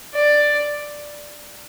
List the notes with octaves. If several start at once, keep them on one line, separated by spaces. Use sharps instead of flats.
D5